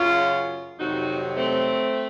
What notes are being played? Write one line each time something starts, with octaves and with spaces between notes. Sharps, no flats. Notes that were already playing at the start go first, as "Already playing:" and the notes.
Already playing: F#2 C#3 F#3 C#4 F4
F2 C3 D#3 F#3 D#4 F#4
A3 C4